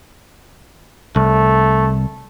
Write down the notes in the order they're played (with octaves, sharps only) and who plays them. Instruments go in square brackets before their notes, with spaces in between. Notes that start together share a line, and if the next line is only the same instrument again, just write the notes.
[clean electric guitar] C2 [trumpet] A3